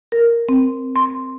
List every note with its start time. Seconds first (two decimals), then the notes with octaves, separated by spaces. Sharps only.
0.12 A#4
0.49 C4
0.96 C6